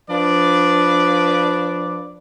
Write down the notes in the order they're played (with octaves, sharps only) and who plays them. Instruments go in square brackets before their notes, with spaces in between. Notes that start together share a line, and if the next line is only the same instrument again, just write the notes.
[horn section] F3 D4 B4 D5